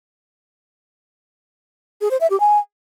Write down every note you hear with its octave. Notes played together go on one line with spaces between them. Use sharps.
G#4
C5
E5
G4
G#5